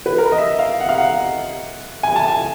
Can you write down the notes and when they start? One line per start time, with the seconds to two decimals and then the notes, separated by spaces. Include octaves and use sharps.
0.06 B4
0.18 A#4
0.32 D#5
0.38 E5
0.59 F5
0.80 F#5
0.89 F5
0.98 F#5
2.03 G#5
2.16 A5
2.28 G#5